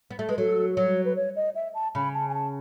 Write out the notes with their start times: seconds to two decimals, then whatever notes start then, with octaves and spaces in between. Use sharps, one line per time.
0.11 B3
0.19 A3
0.29 G#3 B4
0.38 F#3 A4
0.76 F#3 C#5
1.05 B4
1.16 C#5
1.36 D#5
1.55 E5
1.74 A5
1.95 C#3 B5
2.14 A5
2.29 G#5
2.34 A5